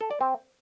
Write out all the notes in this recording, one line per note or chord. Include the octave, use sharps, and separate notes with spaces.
A4
D5
C4